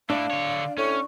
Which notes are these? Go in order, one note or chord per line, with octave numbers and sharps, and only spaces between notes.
A3 D4 E4 F5
D3 C#5
A2 C#4 C#6